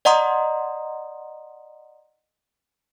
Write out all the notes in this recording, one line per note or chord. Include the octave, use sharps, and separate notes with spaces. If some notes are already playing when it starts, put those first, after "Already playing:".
D5 D#5 F#5 A#5 C6 D#6